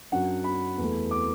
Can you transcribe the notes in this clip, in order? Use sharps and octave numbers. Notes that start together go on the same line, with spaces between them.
F#2 F#3 D4 F#5
B5
E2 E3 A3
D6